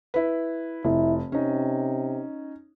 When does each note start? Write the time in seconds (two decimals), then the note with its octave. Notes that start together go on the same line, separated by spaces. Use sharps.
0.14 E4 B4
0.84 F1 E4
1.32 C3 C#4 D#4